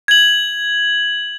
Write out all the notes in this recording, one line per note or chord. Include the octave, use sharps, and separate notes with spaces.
G#6 F#7